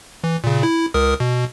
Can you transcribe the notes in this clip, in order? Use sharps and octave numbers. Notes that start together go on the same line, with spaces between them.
E3
A#2 C#3
E4
C#2 A#4 D#6
B2